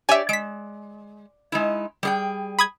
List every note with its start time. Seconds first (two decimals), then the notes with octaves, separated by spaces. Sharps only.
0.09 G4 C#5 D5 E5 G#5
0.29 G#3 B6 D7
1.52 G#3 D#4 E4
2.03 G3 G#4 G5
2.59 B5 D#6 G#6